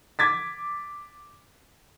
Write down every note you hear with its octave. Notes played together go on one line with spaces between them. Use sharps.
D6 G#6 A6 B6